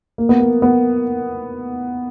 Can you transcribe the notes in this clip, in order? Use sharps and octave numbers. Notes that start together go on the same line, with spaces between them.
A#3
B3
A#3
B3